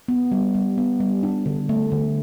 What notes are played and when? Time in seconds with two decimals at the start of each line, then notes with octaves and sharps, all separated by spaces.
0.08 B3
0.32 G3
0.54 G3
0.78 B3
1.00 G3
1.23 D4
1.46 D3
1.69 A3
1.92 D3